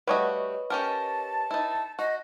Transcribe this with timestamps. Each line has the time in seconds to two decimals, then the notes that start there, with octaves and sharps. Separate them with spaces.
0.07 G3 A3 F#4 B4 C#5 D#5
0.70 C#4 G4 A#4 A5
1.51 D#4 E4
1.99 F#4 D#5